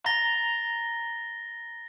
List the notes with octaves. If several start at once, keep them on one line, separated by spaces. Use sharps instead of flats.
A#5 A6 A#6 G7